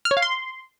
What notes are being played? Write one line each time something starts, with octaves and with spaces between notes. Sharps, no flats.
F6
C#5
F5
C6